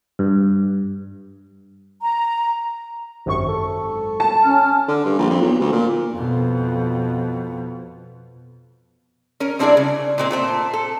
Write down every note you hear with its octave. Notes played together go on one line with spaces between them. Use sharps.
G2
A#5
G#1 F#2 C3 C#6
A4
A5
C#4 F6
D3
G2
A#1
F2
B1
D2
A#2
F2 B2
C#4 A#4
G3 C4 D4 E4 G#4 D5
C#3
A#2 G#3 C4
A#2 A3 C4
A4